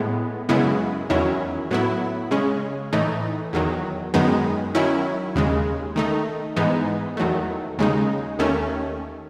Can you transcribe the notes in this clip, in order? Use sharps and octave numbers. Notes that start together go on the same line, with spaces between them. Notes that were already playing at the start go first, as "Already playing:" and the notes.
Already playing: A2 G#3 B3
F#2 C#3 G#3 B3 E4
E2 D#3 F#3 C#4 E4
A2 F#3 B3 E4
C#3 G#3 C#4
A2 E3 A3 D#4
E2 D#3 F#3
F#2 D#3 G#3 B3 D#4
D#3 F#3 C#4 E4
D#2 C#3 G#3
D#3 A3 D#4
G#2 E3 G#3 B3 D#4
E2 D#3 F#3 A3
D#2 C#3 G#3 D#4
D#2 D#3 A3 C#4